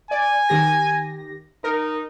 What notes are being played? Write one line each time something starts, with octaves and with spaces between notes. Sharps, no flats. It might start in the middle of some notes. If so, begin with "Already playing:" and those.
D5 G#5
D#3 G4 A#6
D#4 A#4